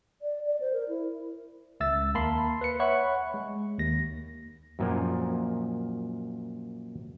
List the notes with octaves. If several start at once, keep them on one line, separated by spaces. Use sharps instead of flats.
D5
D5
C5
A#4
E4
C#2 E5 E6 A6
D#2 A#3 A5 B5 C6 C7
B4 C#7
C#5 E5 F#5 B5 C#6 F#6
G#3
D#2 A#6
F#2 A#2 F3